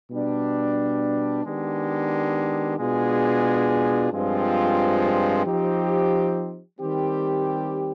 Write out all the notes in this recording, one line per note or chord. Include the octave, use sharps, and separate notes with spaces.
B2 G3 D4
D#3 G#3 B3 D4 G4
B2 G#3 D4 F4 G#4
G2 F3 G#3 C4 F4
F3 C4 D#4 G4
D#3 G3 C4 G4